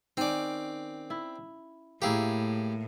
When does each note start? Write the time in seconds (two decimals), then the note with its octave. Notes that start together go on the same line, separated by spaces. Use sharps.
0.17 D#3 C4 C#4 D5
1.10 E4
2.02 A2 A#3 E4 G4 G#4 A#4